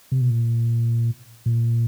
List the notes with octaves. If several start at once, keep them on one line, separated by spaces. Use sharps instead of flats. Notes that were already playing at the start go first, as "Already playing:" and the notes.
C3
B2
A#2
A#2